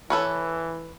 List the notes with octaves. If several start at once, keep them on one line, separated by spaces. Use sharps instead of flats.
E3 A4 B4 C#5